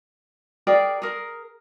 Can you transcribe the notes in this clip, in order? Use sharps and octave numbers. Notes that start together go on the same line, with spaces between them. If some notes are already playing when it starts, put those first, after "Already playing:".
G#4 A#4 D5 G5
G#4 A#4